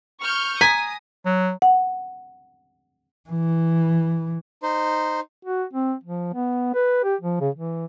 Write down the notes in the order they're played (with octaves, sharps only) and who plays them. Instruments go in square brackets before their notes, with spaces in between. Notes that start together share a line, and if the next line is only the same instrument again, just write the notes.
[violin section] C#6 F6 G6
[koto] G#5 [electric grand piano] A#5 [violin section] D#6 [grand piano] B6
[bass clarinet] F#3
[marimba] F#5
[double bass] E3
[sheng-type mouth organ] D#4 C5
[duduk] F#4
C4
F3
B3
B4
G4
F3
C#3
E3